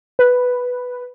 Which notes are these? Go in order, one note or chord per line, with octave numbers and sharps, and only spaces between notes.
B4